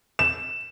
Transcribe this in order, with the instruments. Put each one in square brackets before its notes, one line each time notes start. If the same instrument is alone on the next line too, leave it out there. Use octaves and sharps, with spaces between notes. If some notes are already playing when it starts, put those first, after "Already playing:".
[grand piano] E7